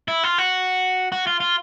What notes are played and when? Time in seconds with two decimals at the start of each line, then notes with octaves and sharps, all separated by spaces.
0.08 E4
0.24 F4
0.38 F#4
1.12 F#4
1.27 F4
1.40 F4